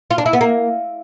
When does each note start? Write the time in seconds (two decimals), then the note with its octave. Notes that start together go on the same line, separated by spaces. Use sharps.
0.11 F4
0.18 D4
0.26 E4
0.33 B3
0.41 A#3